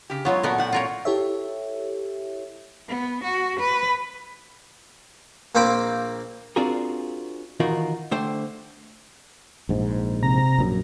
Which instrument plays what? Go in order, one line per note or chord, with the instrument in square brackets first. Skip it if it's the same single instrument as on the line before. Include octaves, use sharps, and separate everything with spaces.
[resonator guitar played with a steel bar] C#3 G4
[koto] F#3 B3 [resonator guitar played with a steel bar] G#3 F4 C#5
[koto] A#2 B3 A#4 [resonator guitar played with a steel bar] A3 F#4
[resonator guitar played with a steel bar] A2 F#5 G5
[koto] F4 A#4 C#5
[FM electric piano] E4 G4 A4 C#5 E5
[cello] B3
F#4
B4
[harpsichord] A#1 A#3 C4 C5 B5 D6
[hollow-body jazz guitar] C4 D4 F4 F#4 G#4 A#4
D#3 E3 D#4 F4 F#4 A#4
D3 A3 C5 G5
[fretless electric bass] A#1 G#2
[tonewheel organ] C3 A#5
[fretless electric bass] A#1 F#2